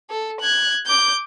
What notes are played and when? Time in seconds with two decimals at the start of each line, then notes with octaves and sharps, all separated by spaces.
0.10 A4
0.40 F#6 G#6
0.87 D6 G6